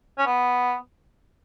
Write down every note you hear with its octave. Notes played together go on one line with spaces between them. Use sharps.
C#4
B3